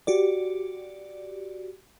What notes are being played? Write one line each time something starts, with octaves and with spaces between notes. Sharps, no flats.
F#4 G4 D5